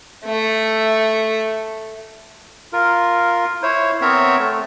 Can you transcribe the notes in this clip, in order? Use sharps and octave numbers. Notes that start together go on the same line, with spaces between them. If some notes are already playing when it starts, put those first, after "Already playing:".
A3 E5
F4 A#4
E4 C5 C#5
B3 C4 A#4 C#5 E5
A3